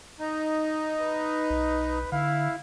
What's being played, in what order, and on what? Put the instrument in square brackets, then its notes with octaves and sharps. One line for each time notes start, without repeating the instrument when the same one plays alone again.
[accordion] D#4
[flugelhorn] B4
[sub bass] B1
[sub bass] D3 [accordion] E4 [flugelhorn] F5